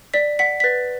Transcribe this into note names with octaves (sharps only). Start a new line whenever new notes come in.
D5 B6
F#5 B6
B6
B4 A6